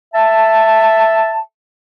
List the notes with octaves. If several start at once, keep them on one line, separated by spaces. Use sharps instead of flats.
E5 A5